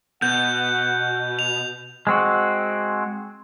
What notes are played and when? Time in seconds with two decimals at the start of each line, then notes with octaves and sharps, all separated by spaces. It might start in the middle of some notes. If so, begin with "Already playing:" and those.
0.22 B2 F#5 G6
1.39 F7
2.07 G#3 C4 F#4